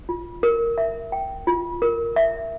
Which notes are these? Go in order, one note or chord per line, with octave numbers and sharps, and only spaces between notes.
F4
A#4
E5
G5
F4
A#4
E5